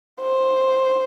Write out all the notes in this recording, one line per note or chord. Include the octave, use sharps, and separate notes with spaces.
C5